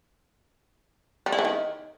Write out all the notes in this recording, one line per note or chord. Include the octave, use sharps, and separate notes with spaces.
G3
E4
E3
D#3